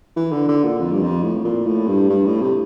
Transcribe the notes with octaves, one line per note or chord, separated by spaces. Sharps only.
E3
D3
D3
A#2
F2
G2
F2
A2
A#2
A2
G2
G2
A2
C3